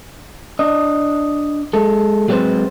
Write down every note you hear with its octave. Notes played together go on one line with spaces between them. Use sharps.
D4 D#5
G#3 A4
F#3 G#3 B3 C4 B4 C5